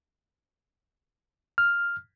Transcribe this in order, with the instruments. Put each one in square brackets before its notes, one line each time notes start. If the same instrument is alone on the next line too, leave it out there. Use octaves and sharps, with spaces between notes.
[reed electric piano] F6